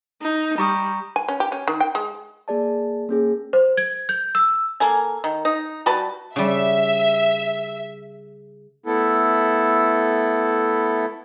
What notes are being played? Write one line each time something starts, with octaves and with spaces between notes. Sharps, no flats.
D#4
G3 A#5 C#6 D#6
G#5
C#4
G4
C#4
D#3
G5
G#3
A#3 G#4 D5 A5
A#3 C#4 G#4
C5
G#6
G6
E6
A#3 A4 G#5
D#3
D#4
G3 F#4 B4 A5
C#3 G3 E5
A3 B3 E4 A4